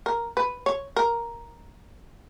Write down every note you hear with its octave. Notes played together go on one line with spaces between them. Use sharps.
A#4
B4
C#5
A#4